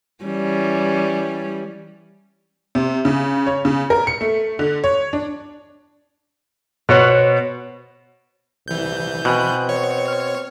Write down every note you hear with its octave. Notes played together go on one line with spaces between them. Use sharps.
E3 G3 C#4
C3
C#3
C#5
C#3
A#4
C#7
A3
D3
C#5
D4
B2 C5 C#5 F#5
C2 E3 G6
B2 C4 G#5 B5 F#6
C#5 F#5
F6